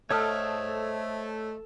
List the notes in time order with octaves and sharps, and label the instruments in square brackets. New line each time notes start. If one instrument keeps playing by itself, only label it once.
[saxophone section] A3 [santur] A4 [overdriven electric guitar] C5 D#5 [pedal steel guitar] C#5 D#6 F6